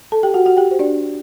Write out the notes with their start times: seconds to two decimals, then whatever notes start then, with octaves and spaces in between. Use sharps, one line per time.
0.12 A4 A5
0.23 G4 G5
0.34 F#4 F#5
0.46 F#4 F#5
0.57 G4 G5
0.71 C5
0.79 D4 D5